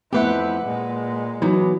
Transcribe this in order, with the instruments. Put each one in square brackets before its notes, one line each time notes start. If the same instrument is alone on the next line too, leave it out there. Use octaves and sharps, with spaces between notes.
[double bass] F2 E4 [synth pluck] A3 B3 [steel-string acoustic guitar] G4 B4 F#5
[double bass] A#2 G#3
[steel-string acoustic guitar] E3 B3 [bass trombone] F#3 [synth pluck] D#4